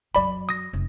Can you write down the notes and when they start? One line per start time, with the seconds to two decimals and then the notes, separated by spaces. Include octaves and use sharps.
0.15 F#2 F#3 D5 B5
0.49 D#6 A#6
0.73 F1 E3